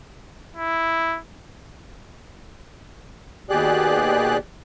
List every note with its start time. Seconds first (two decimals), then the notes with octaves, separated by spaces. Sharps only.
0.57 E4
3.50 D#2 B2 G4 G#4 D5 F#6